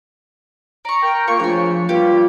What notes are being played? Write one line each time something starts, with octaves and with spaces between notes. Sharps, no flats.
D5 A#5 C#6
A#4 G5
A#3 F4 C#6
C#3 F3 A3 D4 C#5 G#5
G2 G3 A#3 F4 G4